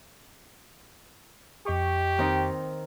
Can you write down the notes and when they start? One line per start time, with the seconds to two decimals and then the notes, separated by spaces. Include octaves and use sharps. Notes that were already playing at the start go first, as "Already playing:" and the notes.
1.66 F2 G4 D#5 C#6
2.18 D#3 C4 D#4